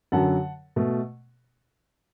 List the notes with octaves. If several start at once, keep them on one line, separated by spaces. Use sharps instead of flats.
F#2 D3 F#3 F#5 A5
B2 A3